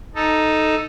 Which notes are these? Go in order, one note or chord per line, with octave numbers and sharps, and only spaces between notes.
D#4 A4